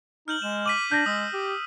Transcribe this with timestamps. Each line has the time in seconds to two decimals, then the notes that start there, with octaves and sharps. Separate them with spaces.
0.28 D#4 F6 G6 F#7
0.42 G#3 E7
0.66 D6 B6 D#7 F#7
0.91 D4 G6 A#6
1.06 G#3 D#6 E6
1.33 G4